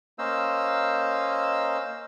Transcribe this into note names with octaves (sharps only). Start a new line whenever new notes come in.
A#3 C#4 C5 D#5 F5 E6